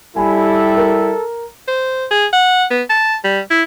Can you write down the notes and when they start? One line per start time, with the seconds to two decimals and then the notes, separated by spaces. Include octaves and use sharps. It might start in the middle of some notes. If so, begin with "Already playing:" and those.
0.16 G3 E4 A4 G#5 B5
0.77 A#4
1.68 C5
2.11 G#4
2.33 F#5
2.71 B3
2.90 A5
3.24 G3
3.51 E4